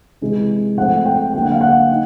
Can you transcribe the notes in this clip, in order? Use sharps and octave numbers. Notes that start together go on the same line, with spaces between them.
C3 E3 G#3
F3 A3 C4 F#5
G5
D3 F#3 A#3 D4 G5
F#5
F5
F#5
D#4